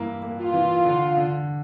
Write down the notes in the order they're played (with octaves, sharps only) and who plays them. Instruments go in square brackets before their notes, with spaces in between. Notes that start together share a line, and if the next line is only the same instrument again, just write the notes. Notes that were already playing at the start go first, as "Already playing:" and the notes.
Already playing: [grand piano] G2 E3 A#3 E4
A#3
[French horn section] F4
[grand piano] E3
D3
D3